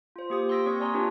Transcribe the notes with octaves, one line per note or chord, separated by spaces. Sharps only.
F4 C5
A#3 G4 D#6
C6 D#6 E6 A#6 B6 D7
A#3 C4 C#5 C#6
D5 G#5 A#5 C6
D4 F4 G4 B4 C#5